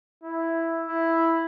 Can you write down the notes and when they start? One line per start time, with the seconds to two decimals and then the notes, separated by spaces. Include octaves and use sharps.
0.24 E4
0.88 E4